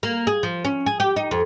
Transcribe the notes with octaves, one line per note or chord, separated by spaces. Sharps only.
A#3
G#4
F3
C#4
G#4
G4
D#4
F2